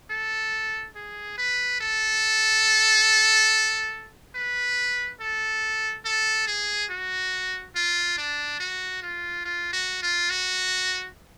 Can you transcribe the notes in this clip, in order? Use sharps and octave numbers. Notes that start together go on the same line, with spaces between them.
A4
G#4
B4
A4
B4
A4
A4
G#4
F#4
F4
D4
F#4
F4
F4
F#4
F4
F#4